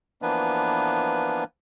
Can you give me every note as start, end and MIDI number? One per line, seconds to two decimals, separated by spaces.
0.22 1.44 52
0.22 1.44 53
0.22 1.44 58
0.22 1.44 59
0.22 1.44 62
0.22 1.44 71